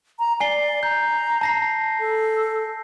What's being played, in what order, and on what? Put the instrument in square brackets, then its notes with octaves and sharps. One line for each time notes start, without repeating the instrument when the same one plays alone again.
[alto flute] A#5
[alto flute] D5 [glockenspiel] G#5 C7 G7
[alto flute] A#5 [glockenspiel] G6
[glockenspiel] A5 A#6 C7
[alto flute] A4